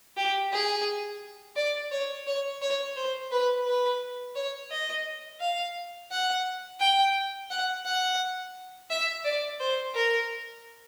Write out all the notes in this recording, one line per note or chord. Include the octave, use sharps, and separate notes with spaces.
G4
G#4
D5
C#5
C#5
C#5
C5
B4
B4
C#5
D#5
F5
F#5
G5
F#5
F#5
E5
D5
C5
A#4